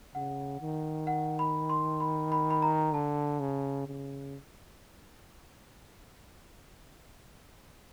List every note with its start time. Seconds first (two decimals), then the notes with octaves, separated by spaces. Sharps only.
0.14 C#3 F#5
0.61 D#3
1.07 F#5
1.39 B5
1.69 C6
2.00 B5
2.32 B5
2.51 B5
2.62 A#5
2.93 D3 A5
3.40 C#3
3.87 C#3